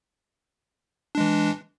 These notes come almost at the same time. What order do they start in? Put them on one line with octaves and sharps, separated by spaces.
D4 G#3 E3